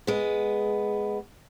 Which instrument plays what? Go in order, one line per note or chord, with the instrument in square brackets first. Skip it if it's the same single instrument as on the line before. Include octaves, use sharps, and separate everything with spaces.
[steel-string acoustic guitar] G#3 B3